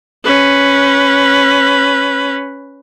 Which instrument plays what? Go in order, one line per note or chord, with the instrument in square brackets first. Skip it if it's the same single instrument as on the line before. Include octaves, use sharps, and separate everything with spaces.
[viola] C#4 B4